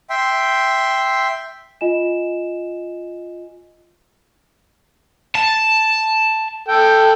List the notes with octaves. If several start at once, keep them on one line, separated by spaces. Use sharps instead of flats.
E5 G5 C6
F4 D#5 G#5 E7
A5
A4 G5